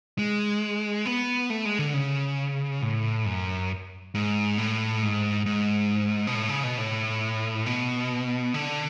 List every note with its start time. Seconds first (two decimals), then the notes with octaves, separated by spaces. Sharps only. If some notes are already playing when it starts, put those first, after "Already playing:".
0.19 G#3
1.06 B3
1.50 A3
1.65 G#3
1.79 D3
1.94 C#3
2.82 A2
3.25 F#2
4.15 G#2
4.58 A2
5.03 G#2
5.46 G#2
6.27 B2
6.35 A2
6.49 C#3
6.63 B2
6.78 A2
7.66 B2
8.54 D3